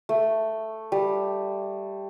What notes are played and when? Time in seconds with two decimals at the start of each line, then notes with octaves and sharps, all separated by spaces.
0.09 A3
0.92 G3